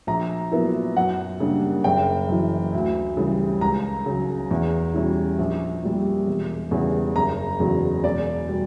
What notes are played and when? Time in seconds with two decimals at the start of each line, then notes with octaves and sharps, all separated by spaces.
0.07 A#1 A#5
0.52 A#2 F#3 B3 E4
0.97 F#2 F#5
1.40 C#3 G3 A#3 D4
1.84 F#1 G5
2.28 F#2 E3
2.73 D2
3.17 C#3 E3 G3
3.61 C#2 A#5
4.06 C#3 F#3
4.51 E2
4.94 B2 G3 C#4 E4
5.39 A#1
5.83 A#2 G3
6.27 E1
6.71 E2 C#3 G3
7.16 F#1 A#5
7.60 E2 C#3 F#3
8.04 E1 D5
8.49 B2 G3